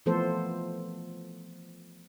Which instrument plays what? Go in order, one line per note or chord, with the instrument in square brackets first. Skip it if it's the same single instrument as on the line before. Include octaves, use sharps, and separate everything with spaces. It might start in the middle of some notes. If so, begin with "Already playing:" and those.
[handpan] E3 F3 A3 B3 A4 C5